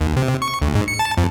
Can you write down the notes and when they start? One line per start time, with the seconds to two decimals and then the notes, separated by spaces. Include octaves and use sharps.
0.01 D#2
0.16 C3
0.42 C#6
0.62 D2
0.75 G#2
0.88 C#7
0.99 A5
1.17 F2